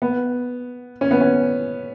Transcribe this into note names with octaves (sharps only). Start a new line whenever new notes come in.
B3
C#4
B3
C#4